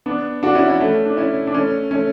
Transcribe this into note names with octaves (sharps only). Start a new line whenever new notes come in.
B3 D4
D4 F#4
C#4 E4
C#4 E4
A3 C#4
D4
C#4 E4
D4
A3 C#4
A3 C#4